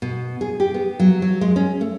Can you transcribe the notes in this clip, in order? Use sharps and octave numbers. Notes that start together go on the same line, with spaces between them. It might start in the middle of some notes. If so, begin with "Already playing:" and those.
B2
G#4
G4
B3
F#3
F#3
G#3
C#4
A3